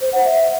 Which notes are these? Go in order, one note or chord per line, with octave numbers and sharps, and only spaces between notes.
C5
F#5
E5